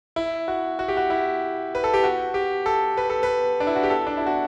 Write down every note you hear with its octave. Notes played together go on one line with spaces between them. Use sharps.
E4
F#4
F#4
G4
F#4
E4
B4
A4
G4
F#4
G4
A4
B4
A4
B4
D4
E4
F#4
G4
A4
D4
E4
F#4